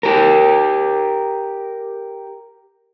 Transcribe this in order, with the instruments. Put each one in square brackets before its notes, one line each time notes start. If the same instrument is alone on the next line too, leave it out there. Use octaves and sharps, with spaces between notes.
[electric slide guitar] G4 A#4